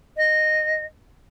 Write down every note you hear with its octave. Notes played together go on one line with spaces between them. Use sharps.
D#5